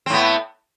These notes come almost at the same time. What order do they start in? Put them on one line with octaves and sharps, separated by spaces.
C4 A2 B3